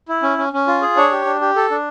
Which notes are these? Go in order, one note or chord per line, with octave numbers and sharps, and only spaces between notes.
E4
C#4
C#4
C#4
F4
G#4
D4 C#5
G4
D4
G4
A4
D4